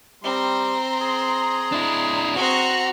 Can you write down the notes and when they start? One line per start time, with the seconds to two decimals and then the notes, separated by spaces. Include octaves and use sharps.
0.24 G3 C4 A#5 C6
1.01 G#4
1.72 D4 E4
2.36 C4 F#4 A#5 C#6 F#6 A#6